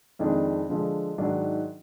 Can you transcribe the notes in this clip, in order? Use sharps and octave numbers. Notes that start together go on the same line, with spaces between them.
F2 D#3 G#3 D4
D3 F3 G#3
G#2 D#3 F#3 D4